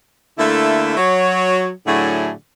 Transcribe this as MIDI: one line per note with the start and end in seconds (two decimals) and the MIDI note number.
0.39 0.94 50
0.39 0.94 57
0.39 0.94 58
0.39 0.94 64
0.97 1.70 54
0.97 1.70 73
1.87 2.31 45
1.87 2.31 50
1.87 2.31 54
1.87 2.31 57
1.87 2.31 64
1.87 2.31 68